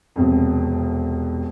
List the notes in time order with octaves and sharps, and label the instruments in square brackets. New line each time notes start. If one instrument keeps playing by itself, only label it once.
[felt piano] E1 C2 F2